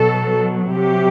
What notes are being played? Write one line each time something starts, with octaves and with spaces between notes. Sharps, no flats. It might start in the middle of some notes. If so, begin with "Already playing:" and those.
Already playing: B2 F#3 A4
C3 F#3 G4